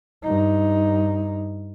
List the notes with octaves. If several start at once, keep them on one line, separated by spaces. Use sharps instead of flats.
G2 D#4